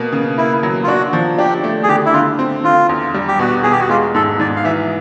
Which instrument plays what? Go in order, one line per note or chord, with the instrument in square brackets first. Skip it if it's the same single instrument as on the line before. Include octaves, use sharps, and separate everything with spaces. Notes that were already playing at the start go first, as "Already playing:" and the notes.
Already playing: [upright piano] B2 A#3
C#3
[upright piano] A#3 [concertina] E4
[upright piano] F#3
[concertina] F4
[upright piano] D4 [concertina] F#4
[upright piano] F3
[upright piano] D4 [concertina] G4
[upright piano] A3
[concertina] G#4
[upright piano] D3 [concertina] G4
[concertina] E4
[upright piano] D3 [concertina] F4
[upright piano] C4
[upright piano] D3 [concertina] F4
[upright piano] E2
G3
[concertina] G4
[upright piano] B2 [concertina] F#4
[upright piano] E2 [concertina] G#4
[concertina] G4
F#4
[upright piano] G#3 [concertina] F4
[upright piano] G#2 [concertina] A4
[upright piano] G#2 [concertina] D5
[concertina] F5
[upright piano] E3 [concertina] E5